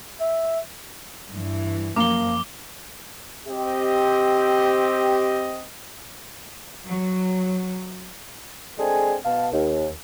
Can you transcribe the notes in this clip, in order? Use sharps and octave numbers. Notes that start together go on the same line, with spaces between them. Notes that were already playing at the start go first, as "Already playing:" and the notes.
E5
G2 E3
F#2 F3 A#3 D6 G7
C4 G4 D#5
F#3
G#3 C4 D4 G#4 A4 G#5
B2 F5 A5
D#2